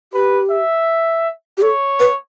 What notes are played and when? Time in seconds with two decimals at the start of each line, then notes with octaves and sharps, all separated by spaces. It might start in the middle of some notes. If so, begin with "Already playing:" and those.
0.13 G4 B4
0.51 E5
1.58 G4
1.62 A4 C#5
2.00 B4